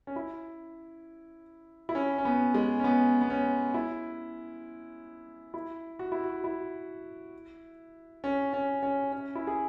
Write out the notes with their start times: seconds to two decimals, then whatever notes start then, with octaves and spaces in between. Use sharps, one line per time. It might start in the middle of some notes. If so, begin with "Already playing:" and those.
0.07 C#4
0.16 E4
1.89 E4
1.95 C#4
2.18 C#4
2.25 B3
2.54 G#3
2.80 C#4
2.84 B3
3.21 B3
3.30 C#4
3.74 E4
5.54 E4
5.99 F#4
6.12 E4
6.24 F#4
6.44 E4
8.24 C#4
8.53 C#4
8.83 C#4
9.13 C#4
9.35 E4
9.47 G#4